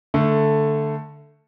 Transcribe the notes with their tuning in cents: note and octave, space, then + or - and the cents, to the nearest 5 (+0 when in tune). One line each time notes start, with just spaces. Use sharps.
D3 +0 A3 +5